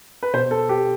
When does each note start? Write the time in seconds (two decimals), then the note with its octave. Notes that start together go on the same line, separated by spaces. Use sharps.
0.23 B4
0.33 B2 C5
0.51 A4
0.69 G4